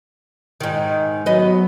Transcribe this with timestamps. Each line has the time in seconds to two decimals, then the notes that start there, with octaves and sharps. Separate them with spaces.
0.60 G#2 D#3
1.26 F#3 B3 D#5